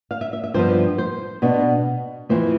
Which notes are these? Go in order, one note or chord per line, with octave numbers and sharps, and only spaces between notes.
F5
E5
E5
E5
G2 F3 B3 C5
C5
B2 B3 D4
F2 E3 A3 C5